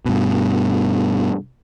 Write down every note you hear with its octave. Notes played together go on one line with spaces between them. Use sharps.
G2 B2